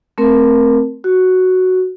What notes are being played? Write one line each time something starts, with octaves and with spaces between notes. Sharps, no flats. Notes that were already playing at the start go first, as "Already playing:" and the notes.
A3 C4 A#4
F#4